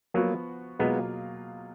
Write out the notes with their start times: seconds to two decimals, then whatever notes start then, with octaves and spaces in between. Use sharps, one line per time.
0.14 F3 F#3 A#3 B3 F#4
0.79 B2 F#3 G#3 A#3 B3 F4 G#4